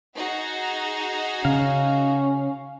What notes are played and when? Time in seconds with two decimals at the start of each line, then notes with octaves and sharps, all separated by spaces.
0.16 D#4 F#4 G#4
1.45 C#3 C#4 F5